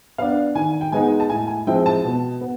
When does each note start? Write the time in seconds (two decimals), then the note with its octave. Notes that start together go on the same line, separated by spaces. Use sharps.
0.18 B3 D4 F5
0.55 D#3 G#5
0.81 G5
0.92 G#3 B3 D#4 G#5
1.20 A5
1.30 A2 G#5
1.48 G#5
1.67 F3 G#3 C4 E4 G5
1.86 A5
2.04 B2
2.41 B3